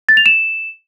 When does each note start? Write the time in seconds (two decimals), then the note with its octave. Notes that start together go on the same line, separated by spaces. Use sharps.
0.09 A6
0.17 F7
0.26 E7